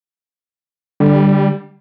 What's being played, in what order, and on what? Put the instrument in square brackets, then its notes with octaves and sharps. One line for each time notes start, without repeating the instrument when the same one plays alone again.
[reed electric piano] D3 [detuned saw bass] G3